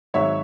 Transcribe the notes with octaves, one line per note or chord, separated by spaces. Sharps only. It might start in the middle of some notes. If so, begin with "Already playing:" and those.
G#1 G#2 F#3 C#5 E5